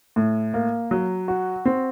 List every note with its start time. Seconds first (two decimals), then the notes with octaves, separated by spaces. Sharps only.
0.16 A2
0.54 A#3
0.91 F#3
1.28 F#4
1.65 C4